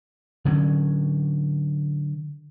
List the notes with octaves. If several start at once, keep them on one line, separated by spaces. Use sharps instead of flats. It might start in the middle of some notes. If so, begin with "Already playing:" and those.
D3 F#3 C#4